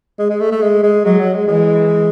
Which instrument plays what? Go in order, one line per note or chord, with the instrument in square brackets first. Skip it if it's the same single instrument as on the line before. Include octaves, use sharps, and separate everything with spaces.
[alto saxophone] G#3
G#3
A3
A3
G#3
G#3
[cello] F#3 [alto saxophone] G#3
[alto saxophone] F#3
G#3
[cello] E3 [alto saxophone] G#3